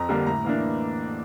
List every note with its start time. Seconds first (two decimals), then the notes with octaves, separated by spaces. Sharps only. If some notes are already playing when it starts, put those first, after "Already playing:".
Already playing: F2 A#5
0.09 D3 G3 A#3 D4
0.27 A2 A#5
0.45 E3 A#3 D4